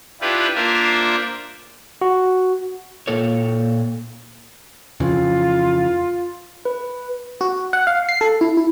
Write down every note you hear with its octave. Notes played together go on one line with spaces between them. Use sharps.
D4 E4 F4 G4 B4
A#3 D4 F4 A#4 C5 E5
F#4
A#2 A4 C#5
F2 C#3 E3 F4
B4
F#4
F#5
F5
C7
A4
E4
E4